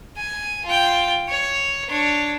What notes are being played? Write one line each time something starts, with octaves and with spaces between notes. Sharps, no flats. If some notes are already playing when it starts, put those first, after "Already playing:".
G#5
F4 G5
C#5
D4 C#5